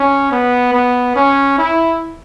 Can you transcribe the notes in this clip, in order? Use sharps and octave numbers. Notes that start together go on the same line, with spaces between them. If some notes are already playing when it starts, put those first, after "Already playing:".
Already playing: C#4
B3
B3
C#4
E4